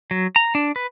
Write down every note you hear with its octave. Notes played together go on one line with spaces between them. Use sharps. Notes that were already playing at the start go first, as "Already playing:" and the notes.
F#3
A#5
D4
B4